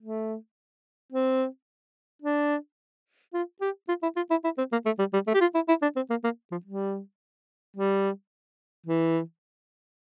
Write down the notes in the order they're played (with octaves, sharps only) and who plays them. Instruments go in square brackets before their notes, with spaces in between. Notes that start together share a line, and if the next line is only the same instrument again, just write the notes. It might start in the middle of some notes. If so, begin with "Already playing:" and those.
[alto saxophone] A3
C4
D4
F4
G4
F4
E4
F4
E4
E4
C4
A#3
A3
G3
G3
A3
G4
F4
E4
E4
D4
C4
A#3
A#3
F3
G3
G3
E3